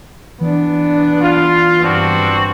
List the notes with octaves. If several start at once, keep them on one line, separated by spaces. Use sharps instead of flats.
E3 B3 D4
F4
G2 C4 D4 F#4